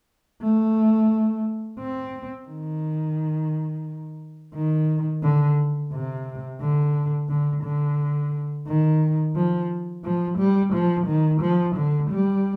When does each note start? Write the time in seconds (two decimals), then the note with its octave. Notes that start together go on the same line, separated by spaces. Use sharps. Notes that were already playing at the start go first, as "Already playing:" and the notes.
0.42 A3
1.79 C4
2.48 D#3
4.54 D#3
5.23 D3
5.92 C3
6.61 D3
7.29 D3
7.63 D3
8.67 D#3
9.36 F3
10.04 F3
10.38 G3
10.73 F3
11.07 D#3
11.41 F3
11.76 D3
12.10 G3